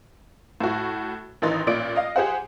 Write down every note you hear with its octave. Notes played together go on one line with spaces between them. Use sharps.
A2 F#4
A1 D#3 E3 D#4 C6 A6
A1 A#2 D5 D7
D#5 F5
G4 G#4 C5 F#5